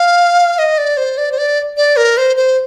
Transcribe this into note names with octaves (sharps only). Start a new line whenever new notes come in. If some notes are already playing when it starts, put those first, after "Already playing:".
Already playing: F5
D#5
D5
C5
D5
C5
D5
D5
A#4
C5
C5